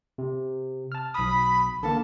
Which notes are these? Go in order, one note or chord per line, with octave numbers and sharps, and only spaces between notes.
C3
A5 F6
B1 B5 D#6
D3 E3 A#3 A5